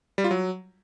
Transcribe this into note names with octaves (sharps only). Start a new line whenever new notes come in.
G3
F4
F#3